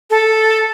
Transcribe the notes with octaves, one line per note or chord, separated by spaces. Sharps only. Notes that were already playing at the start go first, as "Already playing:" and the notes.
A4